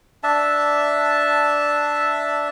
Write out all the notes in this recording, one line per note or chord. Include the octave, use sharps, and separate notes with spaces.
D4 E5 A5